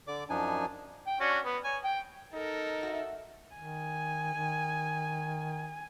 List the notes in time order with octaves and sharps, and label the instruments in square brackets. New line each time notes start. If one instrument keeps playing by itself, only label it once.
[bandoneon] D3 D5 D6
F#2 F3 D4 D#4 G#5
[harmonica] G5
C#4 D4 F#4
B3
C#5 G#5
G5
[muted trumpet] D#4 [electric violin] A4 A#4
[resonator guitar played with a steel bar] F#4 E5
[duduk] D#3 [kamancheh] G#5
[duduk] D#3